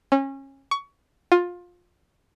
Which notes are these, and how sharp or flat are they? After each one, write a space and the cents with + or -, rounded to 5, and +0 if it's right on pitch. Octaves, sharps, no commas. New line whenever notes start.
C#4 -25
C#6 +20
F4 +20